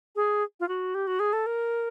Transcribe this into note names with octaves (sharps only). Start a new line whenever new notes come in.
G#4
F4
F#4
G4
F#4
G#4
A4
A#4